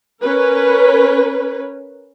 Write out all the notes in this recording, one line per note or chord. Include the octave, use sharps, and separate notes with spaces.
C#4 A#4 B4